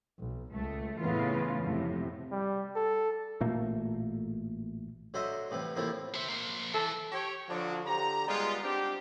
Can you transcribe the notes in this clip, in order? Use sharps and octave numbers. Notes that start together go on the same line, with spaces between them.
B1
C#2 A3
A2 C#3 E3 B3 F4
F2 A2 C3
G3
A4
A1 A#2 A3 A#3
D3 F#3 C5 D#5 E5
A2 C3 E3
E2 A2 C3 A#3 E4 F4
C5 E5
A#3 C5
E3 A4
G4 C#5
D3 F3 F#3 D4 F#4
D3 G4 A#5
G3 G#3 B3 F4
C4 D4 G4